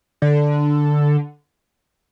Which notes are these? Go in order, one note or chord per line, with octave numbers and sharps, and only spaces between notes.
D3